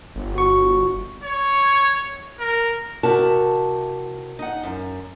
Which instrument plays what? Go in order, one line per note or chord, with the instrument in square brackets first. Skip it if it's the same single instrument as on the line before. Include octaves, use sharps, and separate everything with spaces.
[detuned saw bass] G1
[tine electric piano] F#4 C#6
[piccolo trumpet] C#5
A#4
[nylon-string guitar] C3 E4 F#4 A#4 A5
D#4 F#5
F#2